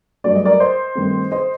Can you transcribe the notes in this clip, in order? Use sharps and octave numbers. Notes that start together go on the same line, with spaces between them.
G2 F#3 A3 D5
D#5
A#4 D5
C5 D#5
G2 D#3 A3 C4
C5 D#5